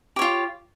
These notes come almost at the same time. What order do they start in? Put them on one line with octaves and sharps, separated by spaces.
G4 C#5 F4